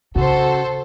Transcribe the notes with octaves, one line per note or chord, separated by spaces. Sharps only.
C#3 F#4 A4 C5